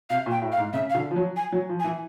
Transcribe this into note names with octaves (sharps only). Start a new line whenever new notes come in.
C3 F5
A#2
G5
A2
F5
G#2
C#3 E5
F5
D3
F3
F#3
G#5
F#3
F3
G#5
E3